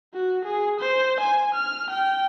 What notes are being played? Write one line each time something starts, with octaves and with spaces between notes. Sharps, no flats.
F#4
G#4
C5
G#5
F6
G5